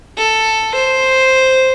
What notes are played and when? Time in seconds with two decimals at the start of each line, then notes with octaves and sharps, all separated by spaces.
0.17 A4
0.74 C5